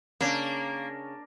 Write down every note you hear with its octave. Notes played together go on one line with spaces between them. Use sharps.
C#3 A#3 C#4 D4